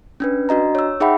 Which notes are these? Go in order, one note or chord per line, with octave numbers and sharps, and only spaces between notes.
C#4 D4 B4
D4 F#4 D#5 A#5
C#5 E6
D#4 G#4 E5 F#5 G5 B5